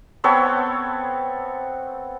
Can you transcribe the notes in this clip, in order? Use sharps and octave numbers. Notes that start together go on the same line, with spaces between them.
B3 C4 A4 C#5